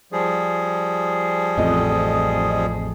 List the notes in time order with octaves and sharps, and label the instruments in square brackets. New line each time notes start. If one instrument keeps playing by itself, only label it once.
[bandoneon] F3 G3 G#4
[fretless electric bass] A1 F2 [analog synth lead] D#5